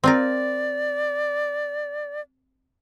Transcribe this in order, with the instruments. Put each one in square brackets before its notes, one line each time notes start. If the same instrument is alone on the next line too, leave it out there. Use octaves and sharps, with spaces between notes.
[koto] C4 F4 A#4 [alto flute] D5